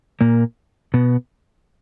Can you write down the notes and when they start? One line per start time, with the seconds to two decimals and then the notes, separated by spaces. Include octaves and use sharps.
0.21 A#2 A#3
0.94 B2 B3